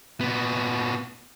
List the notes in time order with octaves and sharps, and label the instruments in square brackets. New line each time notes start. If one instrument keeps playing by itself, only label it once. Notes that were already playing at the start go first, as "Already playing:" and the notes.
[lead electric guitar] A#2 B3